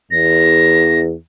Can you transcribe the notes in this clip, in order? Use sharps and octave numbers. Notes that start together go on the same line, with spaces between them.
E2 A#6